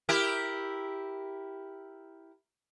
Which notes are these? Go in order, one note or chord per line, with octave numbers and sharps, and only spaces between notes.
E4 G4 A#4